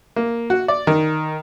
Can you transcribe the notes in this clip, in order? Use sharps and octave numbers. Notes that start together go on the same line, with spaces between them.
A#3
F#4
D5
D#3